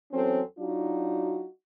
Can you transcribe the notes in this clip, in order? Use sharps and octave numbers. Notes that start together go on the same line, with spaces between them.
E2 F#3 C4 C#4 A4
F#3 D4 D#4 F4 F#4